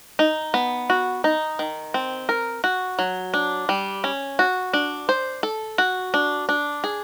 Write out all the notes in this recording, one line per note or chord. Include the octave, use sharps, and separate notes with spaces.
D#4
B3
F#4
D#4
D#3
C4
A#4
F#4
F#3
D4
G3
C#4
F#4
D4
C5
A4
F#4
D4
D4
G#4